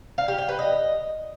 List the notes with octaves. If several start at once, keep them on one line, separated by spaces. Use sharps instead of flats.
F5
G4
G5
B4
D#5